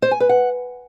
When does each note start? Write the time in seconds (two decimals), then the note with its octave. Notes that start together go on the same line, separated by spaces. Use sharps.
0.02 C5
0.11 G#5
0.20 B4
0.29 F#5